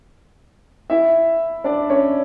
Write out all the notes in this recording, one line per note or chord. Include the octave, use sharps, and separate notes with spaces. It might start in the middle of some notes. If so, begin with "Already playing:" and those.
E4 E5
D4 D5
C#4 C#5